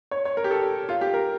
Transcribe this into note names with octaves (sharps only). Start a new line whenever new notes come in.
C#5
C#5
A#4
G4
A4
F4
G4
A#4